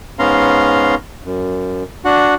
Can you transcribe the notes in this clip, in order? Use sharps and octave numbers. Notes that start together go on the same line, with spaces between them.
G#2 B3 C#4 F5 A#5 C6
F#2
D4 F#4 F#5